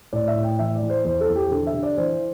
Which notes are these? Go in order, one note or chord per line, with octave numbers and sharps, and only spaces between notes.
A2 D5
E5
A2
G5
E3 E5
D5
E3
C5
E2 C5
A4
E2
G4
D3 A4
E5
D3
D5
E3 C5